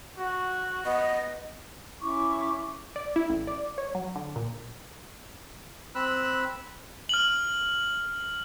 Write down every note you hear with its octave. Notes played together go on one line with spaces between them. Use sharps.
F#4
B3 D#5
C#4 E4 C#6 D6
D5
E4
A1
D5
C#5
F#3
D3
A#2
C4 B5 E6 F#6
F6 F#7